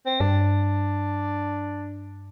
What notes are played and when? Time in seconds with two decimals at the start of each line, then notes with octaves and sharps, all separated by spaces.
0.06 C4
0.20 G2 D4